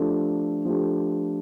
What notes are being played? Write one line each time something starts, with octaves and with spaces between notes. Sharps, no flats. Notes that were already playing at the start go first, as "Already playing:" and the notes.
Already playing: F3 A3 D4 G4
F3 A3 D4 G4